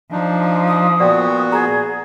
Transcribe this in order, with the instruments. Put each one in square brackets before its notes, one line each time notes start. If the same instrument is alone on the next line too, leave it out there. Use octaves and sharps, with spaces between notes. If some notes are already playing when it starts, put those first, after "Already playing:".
[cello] F3 [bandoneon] D4 D#4
[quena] D#6
[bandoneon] A#2 B3 F#4 [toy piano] D5 G5
[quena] G#4 [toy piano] A#5